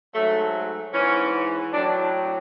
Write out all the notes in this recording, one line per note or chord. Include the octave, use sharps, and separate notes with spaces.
G#2 F#3 A3
G#2 E3 C#4
A2 F#3 D4